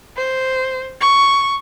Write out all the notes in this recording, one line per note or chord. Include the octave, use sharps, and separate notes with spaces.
C5
C#6